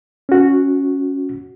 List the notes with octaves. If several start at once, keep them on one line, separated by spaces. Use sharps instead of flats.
C#4 F#4